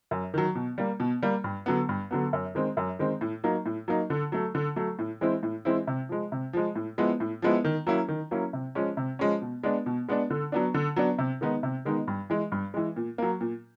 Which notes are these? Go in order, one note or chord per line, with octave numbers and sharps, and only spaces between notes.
F#2
D#3 F#3
B2
G3 A#3
B2
G3 A#3
G2
D3 F#3 B3
G2
D3 F#3 B3
F#2
D#3 G#3 C4
F#2
D#3 G#3 C4
A2
F#3 A#3 D#4
A2
F#3 A#3 D#4
D3
F#3 A3
D3
F#3 A3
A2
E3 G#3 C4 E4
A2
E3 G#3 C4 E4
C3
F3 G#3
C3
F3 G#3
A2
F3 G#3 B3 E4
A2
F3 G#3 B3 E4
D#3
F#3 A#3 C#4 E4
D#3
F#3 A#3 C#4 E4
C3
F3 G#3 C#4
C3
F3 G#3 C#4
B2
G#3 B3 D4
B2
G#3 B3 D4
D3
F#3 B3 D4
D3
F#3 B3 D4
C3
D#3 G#3 B3 D#4
C3
D#3 G#3 B3 D#4
G2
E3 G#3
G2
E3 G#3
A#2
F#3 A#3
A#2